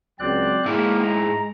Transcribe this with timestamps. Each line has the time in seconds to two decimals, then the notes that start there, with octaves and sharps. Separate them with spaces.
0.19 C#2 F#3 C4 D5 F#6
0.66 G#2 G#3 A#3 E4
1.03 A#5